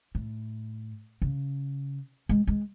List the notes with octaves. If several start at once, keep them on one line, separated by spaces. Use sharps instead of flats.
A2
C#3
G#3
G#3